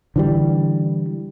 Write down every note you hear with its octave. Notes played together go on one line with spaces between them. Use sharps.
D3 E3 G3